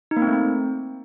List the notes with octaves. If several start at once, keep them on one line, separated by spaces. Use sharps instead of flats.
D#4
A#3
C4
A3
C4